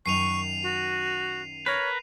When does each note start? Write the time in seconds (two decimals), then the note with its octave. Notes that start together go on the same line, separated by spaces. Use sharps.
0.06 F#2 D#3 D#4 C#6 C7 D#7 F7
0.63 F#4
1.66 A#4 B4 C#5